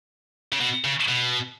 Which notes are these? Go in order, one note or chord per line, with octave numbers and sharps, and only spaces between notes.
C#3
B2
C#3
B2